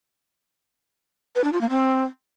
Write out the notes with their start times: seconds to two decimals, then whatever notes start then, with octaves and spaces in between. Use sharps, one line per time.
1.36 B4
1.44 D4
1.53 F4
1.61 A#3
1.70 C4